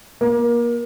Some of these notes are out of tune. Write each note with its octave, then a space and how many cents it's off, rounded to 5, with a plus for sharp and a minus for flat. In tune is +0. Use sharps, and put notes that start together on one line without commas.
A#3 +30